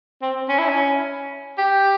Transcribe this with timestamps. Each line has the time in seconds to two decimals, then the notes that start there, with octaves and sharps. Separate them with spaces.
0.22 C4
0.49 C#4
0.59 E4
0.69 C#4
1.58 G4